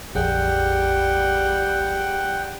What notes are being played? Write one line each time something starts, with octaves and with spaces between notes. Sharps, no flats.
A#1 F2 G3 G#4 F#5 G5